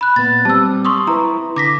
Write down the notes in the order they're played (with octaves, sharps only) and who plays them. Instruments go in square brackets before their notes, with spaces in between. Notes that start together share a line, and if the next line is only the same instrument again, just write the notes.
[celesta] B5 F#6
[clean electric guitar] A#2 B3 [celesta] A6
[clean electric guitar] G3 C4 [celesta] A5 E6
[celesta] C6 C#6 D#6
[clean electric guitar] E4 B4 [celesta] A#5
[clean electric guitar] D3 [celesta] D6 A#6 B6